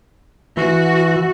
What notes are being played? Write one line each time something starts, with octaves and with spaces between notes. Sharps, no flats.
E3 F#4